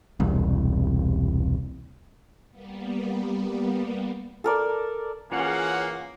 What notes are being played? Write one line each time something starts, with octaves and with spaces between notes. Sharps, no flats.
E1 C2
G3 A#3 B3
A4 A#4 D5
E3 A#3 C#4 F4 G#4 C#5 F#5